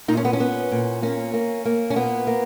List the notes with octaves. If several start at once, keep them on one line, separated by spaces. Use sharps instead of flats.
A#2 D#4
C#4
B3
C#4
B3
A#2
A#3 C#4
A#3
A#3
C#4
A#2 B3
A#3